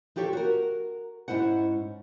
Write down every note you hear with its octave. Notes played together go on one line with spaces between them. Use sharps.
F3 F4 G4 A4 C#5
F#4 A#4
G#2 C#4 E4 C5 F#5